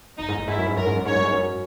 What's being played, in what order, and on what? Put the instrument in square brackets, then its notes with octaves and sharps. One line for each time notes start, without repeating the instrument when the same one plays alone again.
[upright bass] F#2 [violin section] D#4
[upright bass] G#2
F#2
[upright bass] G#2 [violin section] E4
[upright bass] F#2
G#2
[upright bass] F#2 [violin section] A#4
[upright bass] G#2
F#2
[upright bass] G#2 [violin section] C#5
[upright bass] F#2
G#2
F#2